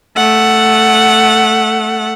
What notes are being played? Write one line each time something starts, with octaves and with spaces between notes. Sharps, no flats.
A3 F#5